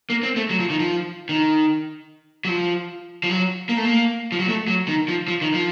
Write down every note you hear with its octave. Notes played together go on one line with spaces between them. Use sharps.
A#3
C4
A3
F#3
F3
D#3
F3
D#3
F#3
F3
F3
F#3
A#3
A3
A#3
F3
F#3
A3
F#3
D#3
F3
F3
D#3
F3